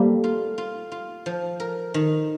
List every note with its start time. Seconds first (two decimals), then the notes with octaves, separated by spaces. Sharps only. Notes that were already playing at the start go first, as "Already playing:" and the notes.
Already playing: G3 A3 A#3 C4
0.24 F4
0.58 F4
0.92 F4
1.26 F3
1.60 A#4
1.94 D#3